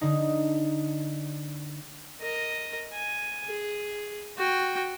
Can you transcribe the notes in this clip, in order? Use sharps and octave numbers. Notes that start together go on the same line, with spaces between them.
D3 D#4
A#4 D#5
G#5
G#4
F#4 G5